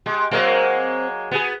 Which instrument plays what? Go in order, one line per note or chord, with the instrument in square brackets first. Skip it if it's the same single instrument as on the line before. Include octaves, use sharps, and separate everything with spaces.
[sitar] G#3 [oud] G4
[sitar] F#3 G#3 A#3 [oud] C4 A#4 F5
[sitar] B3 G#4 [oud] F#4